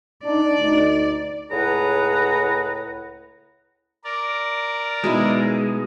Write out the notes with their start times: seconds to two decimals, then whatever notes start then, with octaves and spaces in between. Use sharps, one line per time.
0.25 D4 D#4 D5
0.59 D2 D#4
1.51 C#2 A2 G#4 B4 F#5 A#5
4.04 A#4 D5
5.04 B2 G#3 D#4 E4